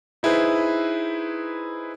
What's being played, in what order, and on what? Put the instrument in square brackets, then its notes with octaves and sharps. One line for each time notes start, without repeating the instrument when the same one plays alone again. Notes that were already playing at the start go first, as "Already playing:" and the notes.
[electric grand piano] D#4 E4 G#4 B4 C5